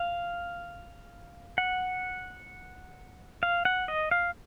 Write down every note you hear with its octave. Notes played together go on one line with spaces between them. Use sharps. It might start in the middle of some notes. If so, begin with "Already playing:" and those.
Already playing: F5
F#5
F5
F#5
D#5
F5